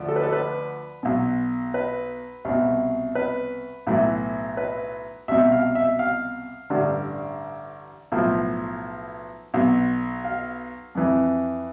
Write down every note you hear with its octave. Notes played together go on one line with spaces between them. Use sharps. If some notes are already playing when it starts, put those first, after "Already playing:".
Already playing: D2 D3 F3
A4
B4
A4
B4
B1 B2
B4
C2 B2
B4
B1 A2 E3
B4
C2 B2 E5
F5
E5
F5
A1 G2 D3
B1 A2 F3
B1 B2
F5
F2 E3